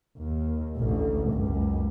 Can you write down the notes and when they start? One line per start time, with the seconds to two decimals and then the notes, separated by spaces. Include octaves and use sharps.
0.17 D#2
0.77 A1 D2
1.30 F#1 C#2